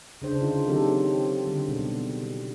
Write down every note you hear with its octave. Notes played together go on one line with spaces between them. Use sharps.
C#3 D4 C5
D3 D#4 F4
D#3 F#3 C4 G4 A4
D3 G3
B2